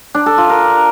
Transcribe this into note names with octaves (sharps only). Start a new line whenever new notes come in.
D4
A4
F4
A#4